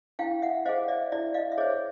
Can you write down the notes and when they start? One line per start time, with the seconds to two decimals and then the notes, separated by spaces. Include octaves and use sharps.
0.19 E4 F5 G5
0.42 E5 F#5
0.66 G#4 C5 D#5 F5
0.88 D5 E5
1.12 E4 D5 E5
1.34 D#5 F5
1.52 E5
1.58 G#4 C5 C#5 D#5